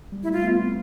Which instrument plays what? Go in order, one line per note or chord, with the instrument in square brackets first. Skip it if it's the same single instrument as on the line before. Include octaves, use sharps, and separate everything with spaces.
[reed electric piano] G3
[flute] E4
[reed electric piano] A3 [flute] F4
[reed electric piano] B3
C4
C4